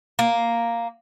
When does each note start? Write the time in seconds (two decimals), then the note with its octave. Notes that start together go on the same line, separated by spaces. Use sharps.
0.19 A#3